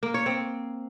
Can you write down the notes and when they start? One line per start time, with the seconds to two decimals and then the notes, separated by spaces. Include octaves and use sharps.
0.03 A#3
0.14 C#5
0.26 C4